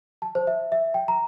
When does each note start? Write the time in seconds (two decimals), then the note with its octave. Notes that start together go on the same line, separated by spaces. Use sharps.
0.22 A5
0.35 C5
0.47 E5
0.72 E5
0.94 G5
1.08 A#5